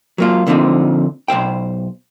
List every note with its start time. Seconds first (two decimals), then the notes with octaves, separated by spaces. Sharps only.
0.18 F#3 A#3 F4
0.47 A#2 D3 F3 A3 C4 D#4
1.28 B1 E2 C5 G5